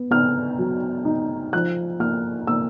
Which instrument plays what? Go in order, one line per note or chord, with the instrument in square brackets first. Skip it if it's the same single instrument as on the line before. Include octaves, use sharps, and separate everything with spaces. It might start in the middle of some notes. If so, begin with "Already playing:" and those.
Already playing: [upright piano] B3
B3 F6
F#3
D#4
F3 F#6
A#3 F6
A#3 E6